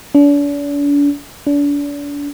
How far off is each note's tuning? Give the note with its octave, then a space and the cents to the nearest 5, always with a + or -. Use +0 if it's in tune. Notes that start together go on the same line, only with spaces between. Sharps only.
D4 -40
D4 -35